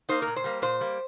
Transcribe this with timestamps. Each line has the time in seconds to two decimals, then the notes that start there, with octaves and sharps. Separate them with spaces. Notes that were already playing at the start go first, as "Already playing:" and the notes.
0.09 A#3 D#4 C5
0.22 A#4
0.27 A#2
0.36 C5
0.44 G3 A#3
0.62 A#2 C5
0.80 G3 A#3